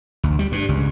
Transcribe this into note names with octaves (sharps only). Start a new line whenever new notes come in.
D2
G3
G2
C#2